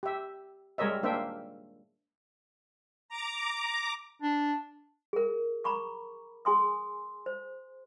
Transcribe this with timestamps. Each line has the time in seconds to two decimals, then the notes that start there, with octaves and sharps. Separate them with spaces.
0.03 G4 E5
0.78 G3 G#3 A#4 C#5 D#5 E5
1.03 A#3 D4 C5 E5 G5
3.09 A#5 D6
4.22 D4
5.13 G#4 A#4
5.64 A#5 B5 C#6 D6
6.45 G#4 G#5 C6 D#6
7.26 C5